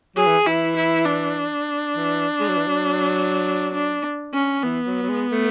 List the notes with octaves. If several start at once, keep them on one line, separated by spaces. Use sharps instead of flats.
F#3 G#4
E3
E3 E4
E4
D4
E3
G#3
F#3
E3
F#3
D4
C#4
E3 B3
F#3
F#3
G#3
A3